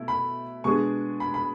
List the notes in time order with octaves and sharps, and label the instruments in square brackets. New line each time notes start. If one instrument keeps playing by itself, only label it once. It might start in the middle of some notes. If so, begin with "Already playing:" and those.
Already playing: [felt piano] B2 A3 E4
[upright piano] B5
[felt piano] B2 G#3 B3 D4 G#4 [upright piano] C#6
[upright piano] B5
B5